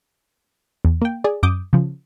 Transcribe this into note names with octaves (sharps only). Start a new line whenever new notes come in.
E2
A#3 G5
G#4 D5
F#2 D6 D#6 G6
C#3 F3